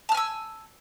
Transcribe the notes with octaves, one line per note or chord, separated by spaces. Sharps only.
G#5 A5 E6 F6